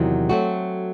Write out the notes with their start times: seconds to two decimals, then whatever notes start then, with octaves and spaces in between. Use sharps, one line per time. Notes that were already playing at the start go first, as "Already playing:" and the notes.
Already playing: E2 C3 D#3 F#3
0.29 F#3 A3 C4 F#4